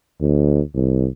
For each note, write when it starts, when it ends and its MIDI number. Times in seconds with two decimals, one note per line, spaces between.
0.21 0.61 38
0.75 1.08 36